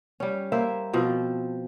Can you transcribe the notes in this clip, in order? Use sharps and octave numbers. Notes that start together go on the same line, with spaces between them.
G3 C#4
A#3 E4 C5 E5
B2 F3 C4